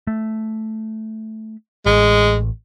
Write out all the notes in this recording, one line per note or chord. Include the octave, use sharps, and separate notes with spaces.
A3
A1 G#3